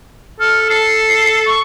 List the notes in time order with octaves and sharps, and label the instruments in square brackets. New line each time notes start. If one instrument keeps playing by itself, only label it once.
[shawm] A4 [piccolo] F6
[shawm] A4 [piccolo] C7
[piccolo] C#6